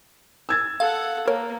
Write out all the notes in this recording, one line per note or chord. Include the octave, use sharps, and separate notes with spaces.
E6 G#6 A6
A4 F5 F#5
A#3 A#4 C#5